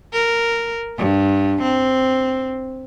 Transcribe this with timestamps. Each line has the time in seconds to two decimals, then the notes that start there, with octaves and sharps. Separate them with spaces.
0.13 A#4
0.98 G2
1.62 C4